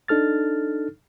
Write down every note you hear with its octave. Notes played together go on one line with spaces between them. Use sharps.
D4 D#4 A4 F6 A6